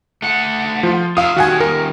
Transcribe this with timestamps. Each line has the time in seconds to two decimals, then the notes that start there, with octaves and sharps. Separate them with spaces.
0.22 A3 F#5
0.83 F3 F4
1.17 F4 E5 F5 D#6
1.37 D#3 G3 F#4 F#5 G#5
1.60 A#4